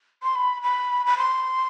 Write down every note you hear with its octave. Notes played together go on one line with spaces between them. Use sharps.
C6
B5
B5
B5
C6